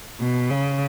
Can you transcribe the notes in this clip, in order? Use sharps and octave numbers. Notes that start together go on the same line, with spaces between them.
B2
C#3